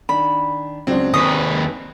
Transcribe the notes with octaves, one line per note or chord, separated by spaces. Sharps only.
D#3 D4 B5
C#2 C#3 F#3 C4 D4
D#2 B4 G#5 C#6 D#6 A#6